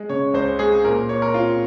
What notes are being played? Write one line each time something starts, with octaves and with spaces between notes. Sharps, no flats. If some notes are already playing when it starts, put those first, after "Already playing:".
Already playing: G#3
C#3 C#5
C#2 C5
G#3 G#4
A#2 A#4
A#2 C#5
A#4
C4 F4